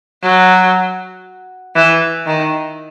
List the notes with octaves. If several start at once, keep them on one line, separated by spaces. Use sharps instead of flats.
F#3
E3
D#3